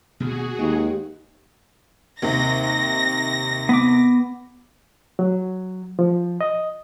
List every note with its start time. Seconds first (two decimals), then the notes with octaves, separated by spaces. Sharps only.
0.20 D#1 D2 B2 F#4 G#4
0.59 D#2 G#3
2.22 D#2 C3 A#6
3.69 B3 D6
5.19 F#3
5.99 F3
6.41 D#5